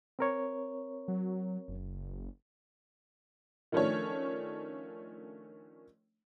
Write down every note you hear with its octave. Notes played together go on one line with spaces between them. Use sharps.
C4 A#4 C#5
F#3
F#1
D#3 F3 A3 C#4 D4 C#5